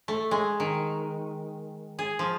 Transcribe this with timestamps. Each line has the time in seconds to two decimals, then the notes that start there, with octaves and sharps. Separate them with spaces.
0.08 A3
0.31 G#3
0.60 D#3
1.99 G#4
2.19 F3